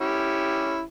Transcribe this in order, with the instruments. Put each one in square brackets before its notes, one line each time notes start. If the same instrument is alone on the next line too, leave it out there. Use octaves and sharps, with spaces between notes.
[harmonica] C#4 E4 G4